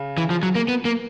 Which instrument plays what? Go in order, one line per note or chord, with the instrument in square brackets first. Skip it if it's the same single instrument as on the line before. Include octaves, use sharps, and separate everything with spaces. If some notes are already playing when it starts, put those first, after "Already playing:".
Already playing: [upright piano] C#3
[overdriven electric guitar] E3
F3
F#3
A#3
B3
A#3